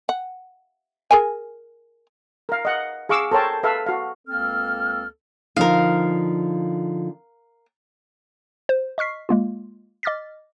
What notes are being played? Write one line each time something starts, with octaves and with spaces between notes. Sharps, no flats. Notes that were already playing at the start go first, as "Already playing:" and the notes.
F#5
G#4 A#4 G#5
A#4 F5
D#5 F#5
G#4 F5 C#6 D6 E6
A4 A#4 C5 C#5 G5 A5
A4 B4 E5 F5
F#4 F5
C#2 A#3 C4 A4 F6
D3 F3 D#4 A#4 F5
C5
D#5 C#6 F6 B6 C7
G#3 A#3 F4
D#5 D6 F6 A6 B6